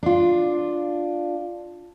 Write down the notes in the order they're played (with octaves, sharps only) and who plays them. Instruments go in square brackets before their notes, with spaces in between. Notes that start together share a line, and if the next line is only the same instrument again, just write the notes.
[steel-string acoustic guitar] D4 F4